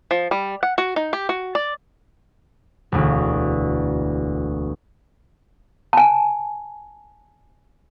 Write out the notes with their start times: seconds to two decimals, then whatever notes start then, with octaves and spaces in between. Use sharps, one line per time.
0.11 F3
0.31 G3
0.63 F#5
0.78 F#4
0.96 D#4
1.13 G4
1.29 F#4
1.55 D5
2.92 E1 D2
5.93 G#5 A5